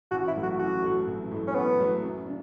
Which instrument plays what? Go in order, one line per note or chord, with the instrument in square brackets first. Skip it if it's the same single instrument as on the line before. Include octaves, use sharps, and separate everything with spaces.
[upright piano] A1 [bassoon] F#4
[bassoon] E4
[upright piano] A2 F#3 A3
[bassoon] F#4
[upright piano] A1 [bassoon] F#4
[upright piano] A2 F#3 A3
A1
A2 F#3 A3
[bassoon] C#4
[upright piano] A1 [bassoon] B3
[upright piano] A2 F#3 A3
F#2
C#3 D4